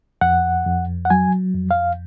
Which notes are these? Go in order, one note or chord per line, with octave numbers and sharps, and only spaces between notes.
F2 F#5
F2
F#5
F#3 G#5
F2
F5